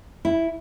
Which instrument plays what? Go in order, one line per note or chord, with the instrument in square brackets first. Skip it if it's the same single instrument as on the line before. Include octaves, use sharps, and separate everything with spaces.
[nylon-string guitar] E4